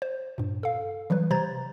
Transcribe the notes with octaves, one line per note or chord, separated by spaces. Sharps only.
C5
G2 A#2
A4 F5
E3 F#3 G3 B4
C3 C5 A#5 G#6 A6